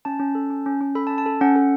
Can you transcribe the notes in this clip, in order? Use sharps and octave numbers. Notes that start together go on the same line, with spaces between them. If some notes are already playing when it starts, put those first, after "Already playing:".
C#4 A5
C#4
A4
C#4
C#4
C#4
A4 B5
A5
C#4
A5
A4
C#4 F#5
A4